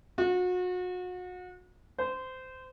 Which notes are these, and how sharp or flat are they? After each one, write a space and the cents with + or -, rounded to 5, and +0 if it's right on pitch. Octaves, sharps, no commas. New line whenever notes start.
F#4 -35
C5 -20